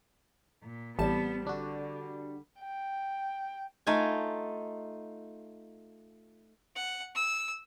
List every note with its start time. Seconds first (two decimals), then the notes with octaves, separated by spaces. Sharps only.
0.62 A#2
0.99 A1 G3 B3 C4 A5 E7
1.47 D3 D4 F#4
2.60 G5
3.87 A3 D#4 F4 G#5
6.76 F#5
7.15 E6